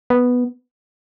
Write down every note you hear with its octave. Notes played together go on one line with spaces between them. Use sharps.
B3